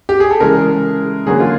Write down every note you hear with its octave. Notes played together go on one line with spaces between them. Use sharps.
G4
G#4
A4
C#3 E3 G#3 A#4
D3 F#3 A#3 G#4
F4